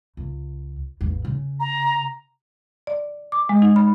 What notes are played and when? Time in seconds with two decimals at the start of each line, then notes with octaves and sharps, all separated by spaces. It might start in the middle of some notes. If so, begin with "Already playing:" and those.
0.17 C#2
1.01 A1 E2
1.25 C#3
1.60 A#5
2.87 D5
3.32 D6
3.49 G#3
3.62 D#4
3.76 B5